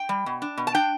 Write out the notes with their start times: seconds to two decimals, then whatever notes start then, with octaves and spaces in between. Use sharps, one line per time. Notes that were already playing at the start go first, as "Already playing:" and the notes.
Already playing: G5
0.09 G3
0.26 B2
0.42 D4
0.57 B2
0.67 A5
0.74 D4 G5